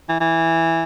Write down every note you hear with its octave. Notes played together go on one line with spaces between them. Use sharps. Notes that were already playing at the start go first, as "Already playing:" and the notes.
E3
E3